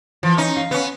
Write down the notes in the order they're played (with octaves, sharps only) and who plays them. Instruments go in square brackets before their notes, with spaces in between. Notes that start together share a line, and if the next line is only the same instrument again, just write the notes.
[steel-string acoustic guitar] E3 [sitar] F3
[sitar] C#4 D#4
[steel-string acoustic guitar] F5
[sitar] B3 C#4